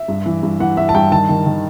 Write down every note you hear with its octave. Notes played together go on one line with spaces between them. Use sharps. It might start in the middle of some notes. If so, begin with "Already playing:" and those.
Already playing: E5
G2
E3
G2
E3 F#5
G2 E5
A5
G2 G5
D#3 A5
D#3
D#3